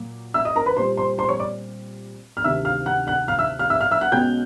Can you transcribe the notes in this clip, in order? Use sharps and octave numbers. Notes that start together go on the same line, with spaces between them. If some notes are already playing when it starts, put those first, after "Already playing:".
Already playing: A#2 F#3 A#3
E5 E6
D#5 D#6
A#4 A#5
B4 B5
A#2 G3 C4 C5 C6
C5 C6
C5 C6
C#5 C#6
D5 D6
F6
D2 C3 D#3 E5 E6
F5 F6
F#5 F#6
F#5 F#6
F5 F6
E5 E6
F5 F6
E5 E6
F5 F6
E5 E6
F#5 F#6
B1 B2 G#3 C#4 G5 G6